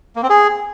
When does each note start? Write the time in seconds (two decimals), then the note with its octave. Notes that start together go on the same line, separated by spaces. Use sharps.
0.16 A#3
0.23 C4
0.30 G#4